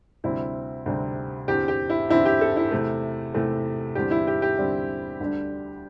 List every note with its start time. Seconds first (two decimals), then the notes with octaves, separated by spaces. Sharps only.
0.24 D2 C3 G3 C4 E4
0.86 D2 C3 G3 C4
1.48 E2 D3 C4 G4
1.68 G4
1.90 E4
2.09 E2 D3 C4 E4
2.26 G4
2.41 A4
2.56 E4
2.71 E2 C3 A3
3.34 E2 C3 A3
3.95 E2 D3 G3 C4 G4
4.11 E4
4.27 G4
4.42 G4
4.57 E2 D3 G3 C4
5.20 D2 D3 G3 D4